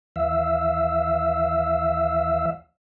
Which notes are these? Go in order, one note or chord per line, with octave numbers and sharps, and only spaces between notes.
D#2 E3 E5 F5 E6